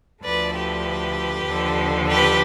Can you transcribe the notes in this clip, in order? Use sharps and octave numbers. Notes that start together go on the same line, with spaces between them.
D2 D3 F3 B4 D5
G4 B4
D#2 D3 F3
G4 B4